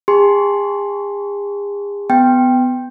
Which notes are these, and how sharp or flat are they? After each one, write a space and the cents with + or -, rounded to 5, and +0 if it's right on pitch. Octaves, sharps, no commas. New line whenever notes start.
G#4 -40 A5 -25 C6 +5
B3 +20 G5 +0